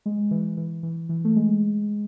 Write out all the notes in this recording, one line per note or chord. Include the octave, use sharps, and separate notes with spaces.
G#3
E3
E3
E3
E3
A3
G#3